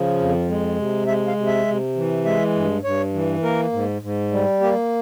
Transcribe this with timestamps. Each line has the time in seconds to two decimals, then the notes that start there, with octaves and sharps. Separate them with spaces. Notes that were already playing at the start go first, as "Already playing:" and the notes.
Already playing: C#3 F3
0.19 F2
0.49 G#3
0.78 C3
1.07 G#3 E5
1.27 F5
1.37 C3
1.47 E5
1.67 C3
1.96 E3
2.25 G#3 E5
2.55 G2
2.84 G2 C#5
3.13 E3
3.43 A#3 A#4
3.73 G#2
4.02 G#2
4.32 G3
4.61 A#3 G4